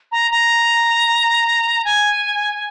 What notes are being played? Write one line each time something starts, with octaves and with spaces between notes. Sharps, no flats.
A#5
A#5
G#5